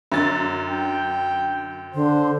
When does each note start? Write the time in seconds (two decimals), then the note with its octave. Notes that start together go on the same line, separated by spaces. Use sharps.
0.12 F#2 D3 A6
0.68 G5
1.94 D3 C5